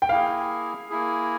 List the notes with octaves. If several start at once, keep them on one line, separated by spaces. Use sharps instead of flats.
G5
A#3 E4 G#4 F5
A#3 E4 G#4